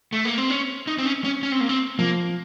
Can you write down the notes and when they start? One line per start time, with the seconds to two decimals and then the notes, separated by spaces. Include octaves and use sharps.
0.13 A3
0.25 A#3
0.38 C4
0.50 C#4
0.87 D#4
0.98 C4
1.06 C#4
1.24 C#4
1.43 C#4
1.52 C4
1.61 A#3
1.69 C4
1.99 F3 A#3